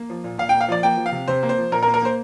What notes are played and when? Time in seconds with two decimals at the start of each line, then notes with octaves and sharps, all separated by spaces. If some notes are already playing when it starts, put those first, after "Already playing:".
Already playing: A#3
0.10 F3
0.24 A#2
0.38 A#2 F5
0.49 A#3 G5
0.61 F5
0.68 F3 D5
0.83 A#3 G5
0.97 F3
1.06 F5
1.12 C3
1.28 C3 C5
1.43 A#3
1.49 C5
1.58 F3
1.72 A#2 A#4
1.83 A#4
1.87 A#3
1.94 A#4
2.02 A#3 C5